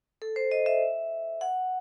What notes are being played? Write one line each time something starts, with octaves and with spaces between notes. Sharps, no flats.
A4
C5
D#5
E5
F#5